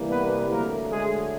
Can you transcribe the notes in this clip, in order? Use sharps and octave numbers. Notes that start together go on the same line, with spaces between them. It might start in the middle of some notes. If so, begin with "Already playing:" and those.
Already playing: C3 E3 G3 A#3
B3 B4
D3 F#3 A3 A#3 A#4
G#3 G#4